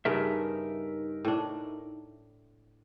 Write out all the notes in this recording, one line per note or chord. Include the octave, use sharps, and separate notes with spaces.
G2 C#3 A3 D#4 A#4 E5
A2 D4